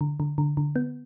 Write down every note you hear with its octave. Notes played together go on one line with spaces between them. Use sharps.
D3
D3
D3
D3
B3